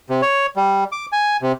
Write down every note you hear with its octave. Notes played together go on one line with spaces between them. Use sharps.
C3
C#5
G3
D6
G#5
C3